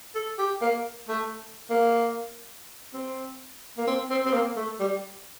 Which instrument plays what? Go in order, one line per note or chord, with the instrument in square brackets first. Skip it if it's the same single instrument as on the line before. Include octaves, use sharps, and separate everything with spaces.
[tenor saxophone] A4
G4
A#3
A3
A#3
C4
A#3
C4
C4
C4
A#3
A3
G3